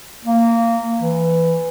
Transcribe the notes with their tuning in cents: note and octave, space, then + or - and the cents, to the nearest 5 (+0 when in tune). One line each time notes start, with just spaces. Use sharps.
A#3 -15
E3 +5